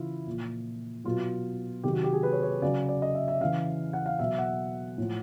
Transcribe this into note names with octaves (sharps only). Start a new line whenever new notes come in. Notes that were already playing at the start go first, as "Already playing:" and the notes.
Already playing: C#3 E3 E4 F4
A#2 F3
B2 F#3 F4
C3 D#3 F#3 G4
F#4
G4
G#4
B4
C#5
C#5
C#3 F#3 D5
D5
D#5
E5
E5
C#3 E3 F5
F#5
F5
B2 F#3 E5
F#5
A2 F3